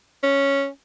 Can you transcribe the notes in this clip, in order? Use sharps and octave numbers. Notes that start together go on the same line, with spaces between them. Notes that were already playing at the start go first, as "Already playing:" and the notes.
C#4